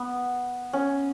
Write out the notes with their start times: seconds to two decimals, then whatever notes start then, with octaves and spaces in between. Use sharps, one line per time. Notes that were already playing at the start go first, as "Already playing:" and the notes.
Already playing: B3
0.73 C#4